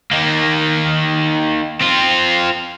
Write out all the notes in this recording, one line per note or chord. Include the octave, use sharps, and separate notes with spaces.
D#3 A#3
C4 F4